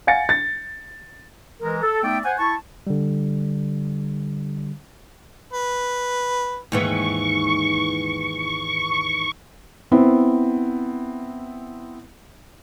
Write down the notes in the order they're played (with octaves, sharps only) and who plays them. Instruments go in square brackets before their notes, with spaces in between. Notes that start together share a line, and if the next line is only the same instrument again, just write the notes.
[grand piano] F5 F#5 G#5 A6 A#6 C#7
A6
[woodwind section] E3 G#3 A#4
A4
A3 B3 D#4 D5 E5 G5
C5 F#5 G#5
E4 A5 C#6
[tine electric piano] D3 G3
[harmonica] B4
[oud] D#2 G#2 E3 [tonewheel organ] C#6
[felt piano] B3 C4 E4